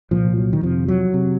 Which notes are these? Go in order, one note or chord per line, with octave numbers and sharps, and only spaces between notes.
C2 A#2 F3
F#3
D#3
F2 C3 F3
F#3
C3